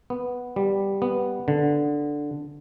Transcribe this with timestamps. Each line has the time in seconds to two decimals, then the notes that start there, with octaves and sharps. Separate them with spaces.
0.10 B3
0.56 G3
1.02 B3
1.48 D3